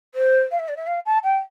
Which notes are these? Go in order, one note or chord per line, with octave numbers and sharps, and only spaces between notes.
C5
F5
E5
D5
E5
F5
A5
G5